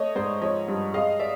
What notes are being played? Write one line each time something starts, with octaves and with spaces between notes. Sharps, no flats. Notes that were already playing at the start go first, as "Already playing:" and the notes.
Already playing: A3 C#5 D#5
G#2 C5 D5
F3 C#5 D#5
G2
G#3 D#5 F5
D5 E5